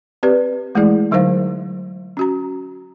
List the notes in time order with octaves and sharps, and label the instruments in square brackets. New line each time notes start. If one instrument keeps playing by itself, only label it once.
[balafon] C4 G4 B4 D5
E3 G#3 A3 E4 G#4 D5
D3 F#3 D#4 A#4 C5 F5
C#4 F#4 A#5